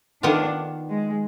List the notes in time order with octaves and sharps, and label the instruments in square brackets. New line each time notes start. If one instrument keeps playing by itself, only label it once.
[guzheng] D#3 B3 F4 [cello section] D4
[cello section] G#3